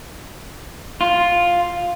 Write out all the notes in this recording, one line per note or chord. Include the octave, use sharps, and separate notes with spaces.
F4